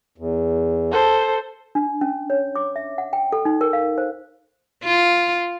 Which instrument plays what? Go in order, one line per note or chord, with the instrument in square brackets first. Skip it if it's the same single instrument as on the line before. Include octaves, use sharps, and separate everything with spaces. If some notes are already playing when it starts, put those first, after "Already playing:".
[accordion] E2
[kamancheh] A4 C5
[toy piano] D4
C#4
C#5
D6
E5
F#5
G5
A4
D#4
A#4
F5
C5
[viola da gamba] F4